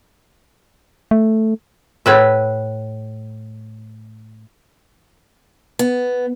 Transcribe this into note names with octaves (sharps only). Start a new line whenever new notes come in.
A3
A2 B4 E5
B3